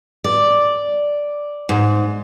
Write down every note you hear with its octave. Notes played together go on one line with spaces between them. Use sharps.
D5
G#2